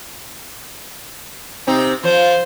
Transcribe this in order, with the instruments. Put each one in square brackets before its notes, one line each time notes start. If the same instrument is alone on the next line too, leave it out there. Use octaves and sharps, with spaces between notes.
[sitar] C3 C4 D#4
[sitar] F3 [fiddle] C5